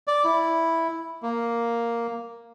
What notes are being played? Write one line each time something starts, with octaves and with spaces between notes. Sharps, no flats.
D5
E4
A#3